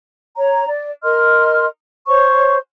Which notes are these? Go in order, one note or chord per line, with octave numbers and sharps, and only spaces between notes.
C#5 A#5
D5
A#4 D#5 C6 F6
C5 C#5 C#6